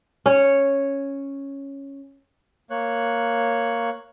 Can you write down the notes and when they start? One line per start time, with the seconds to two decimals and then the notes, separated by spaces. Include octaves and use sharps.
0.26 C#4 C#5
2.70 A#3 C#5 F#6